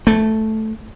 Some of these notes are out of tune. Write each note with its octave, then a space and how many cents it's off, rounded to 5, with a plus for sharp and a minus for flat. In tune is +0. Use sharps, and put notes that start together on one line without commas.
A3 -5